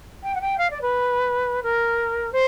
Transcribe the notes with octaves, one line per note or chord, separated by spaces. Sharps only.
G5
F#5
G5
F5
D5
B4
A#4
C5